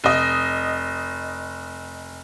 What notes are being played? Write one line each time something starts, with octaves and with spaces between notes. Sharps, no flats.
F1 D#5